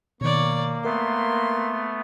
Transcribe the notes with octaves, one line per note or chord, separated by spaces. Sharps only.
B2 D#3 A#3 C#5 D5
A3 B3 A#4 C6